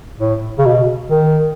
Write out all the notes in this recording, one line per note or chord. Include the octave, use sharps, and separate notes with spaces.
A2
C#3
B2
D#3